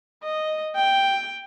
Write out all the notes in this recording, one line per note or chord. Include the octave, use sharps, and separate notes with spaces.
D#5
G5